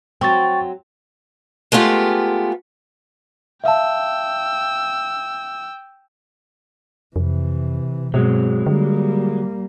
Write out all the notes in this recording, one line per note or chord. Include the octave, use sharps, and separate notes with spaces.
F#3 C4 G5 C#6 A6
G#3 A3 B3 F4 G4
E5 F5 G5 A5 E6
F2 C3 E3
G2 B2 F#3 G#3 C4
D3 G3 A#3